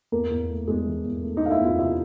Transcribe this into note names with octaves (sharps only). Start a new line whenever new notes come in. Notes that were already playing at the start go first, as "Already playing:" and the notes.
E2 A#3 A#4
E2
A3
E2 G#3 G#4
E3
E2
A3
D#4 D#5
A3 F5
E4 E5
E2 F4 F5
C3 E4 E5